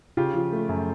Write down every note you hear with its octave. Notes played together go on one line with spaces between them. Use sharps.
C#3 F4 G4
F3
A3
F#2